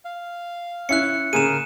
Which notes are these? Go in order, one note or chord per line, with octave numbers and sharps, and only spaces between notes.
F5
C#4 E4 F#6 C#7
C#3 G#4 A#4 D#7 E7